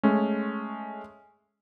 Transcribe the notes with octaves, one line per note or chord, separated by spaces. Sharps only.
G#3 A3 C#4